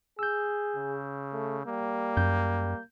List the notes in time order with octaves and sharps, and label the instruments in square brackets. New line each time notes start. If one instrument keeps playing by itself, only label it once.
[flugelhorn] G#4 [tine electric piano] E6 G6
[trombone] C#3
[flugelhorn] A3
[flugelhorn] G3 [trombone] A#3
[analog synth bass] F#2 [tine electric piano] G6